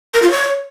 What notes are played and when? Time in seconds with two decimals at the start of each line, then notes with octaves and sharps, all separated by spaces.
0.14 A#4
0.22 F4
0.31 C#5